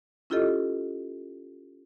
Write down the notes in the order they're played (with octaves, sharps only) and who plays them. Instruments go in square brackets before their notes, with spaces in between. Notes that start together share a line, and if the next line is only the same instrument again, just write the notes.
[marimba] C#4 E4 F4 G4 A4 D#5